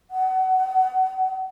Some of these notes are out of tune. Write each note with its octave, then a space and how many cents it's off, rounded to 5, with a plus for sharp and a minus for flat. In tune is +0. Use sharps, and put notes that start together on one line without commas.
F#5 +25